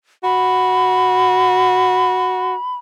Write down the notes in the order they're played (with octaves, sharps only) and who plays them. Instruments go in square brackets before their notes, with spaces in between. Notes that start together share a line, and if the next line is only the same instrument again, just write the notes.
[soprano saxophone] F#4 [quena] B5